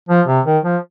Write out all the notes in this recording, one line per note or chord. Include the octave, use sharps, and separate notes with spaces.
F3
C3
D#3
F3